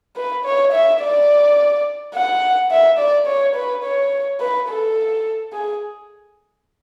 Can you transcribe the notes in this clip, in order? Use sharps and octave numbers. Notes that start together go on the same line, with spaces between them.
B4
C#5
E5
D5
F#5
E5
D5
C#5
B4
C#5
B4
A4
G#4